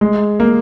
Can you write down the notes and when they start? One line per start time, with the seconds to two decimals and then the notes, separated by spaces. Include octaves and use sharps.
0.01 G#3
0.40 A#3